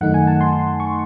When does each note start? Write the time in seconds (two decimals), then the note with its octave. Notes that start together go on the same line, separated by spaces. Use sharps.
0.01 F#2 D#3 A3 D#4 F#5
0.14 G#5
0.27 A5
0.41 C6
0.80 C#6